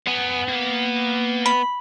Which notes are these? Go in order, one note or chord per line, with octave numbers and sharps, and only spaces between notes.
B3 F#5 G#5
A#3
B5